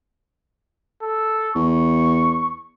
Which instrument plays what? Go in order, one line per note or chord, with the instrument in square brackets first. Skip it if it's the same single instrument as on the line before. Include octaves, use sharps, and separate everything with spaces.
[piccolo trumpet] A4
[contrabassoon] E2 [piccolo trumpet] C#6